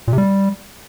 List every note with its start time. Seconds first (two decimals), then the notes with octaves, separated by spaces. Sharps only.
0.08 A#2
0.13 C3
0.18 G3